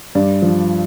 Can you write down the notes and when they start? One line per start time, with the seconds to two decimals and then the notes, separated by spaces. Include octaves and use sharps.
0.15 G2 D5
0.42 F3